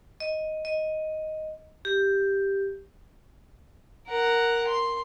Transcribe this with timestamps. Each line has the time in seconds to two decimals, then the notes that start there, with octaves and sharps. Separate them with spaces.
0.20 D#5
0.65 D#5
1.85 G4
4.07 A#4 F#5
4.67 C6